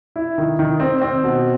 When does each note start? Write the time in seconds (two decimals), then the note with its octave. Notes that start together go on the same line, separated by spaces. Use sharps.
0.16 E4
0.38 D#3
0.59 D#3
0.80 C4
1.02 C4
1.24 B2